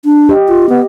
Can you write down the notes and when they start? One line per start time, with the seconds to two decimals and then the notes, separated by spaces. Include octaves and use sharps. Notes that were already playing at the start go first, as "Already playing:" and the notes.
0.05 D4
0.29 G4 D#5
0.48 F4
0.69 B3